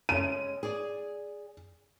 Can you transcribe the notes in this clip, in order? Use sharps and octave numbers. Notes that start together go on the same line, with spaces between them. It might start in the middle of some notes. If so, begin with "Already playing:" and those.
G#3 C#4 D#7
G#4 D5